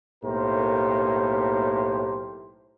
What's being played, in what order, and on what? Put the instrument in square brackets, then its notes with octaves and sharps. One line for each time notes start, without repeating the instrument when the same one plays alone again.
[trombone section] B1 A2 A#3 G4 A#4 C5